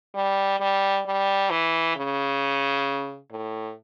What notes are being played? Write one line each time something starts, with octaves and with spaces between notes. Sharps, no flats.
G3
G3
G3
E3
C#3
A2